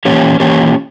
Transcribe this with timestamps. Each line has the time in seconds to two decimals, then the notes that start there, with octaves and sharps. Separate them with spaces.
0.05 E3 A#3 C#4 G4 C#5
0.40 E3 A#3 C#4 G4 C#5